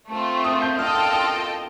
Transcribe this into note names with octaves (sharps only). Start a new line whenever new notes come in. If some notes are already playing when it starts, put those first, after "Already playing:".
A3 C4 F4
D#6
G6
F4 A4 D#5 G5 F6
D#6
F6
F6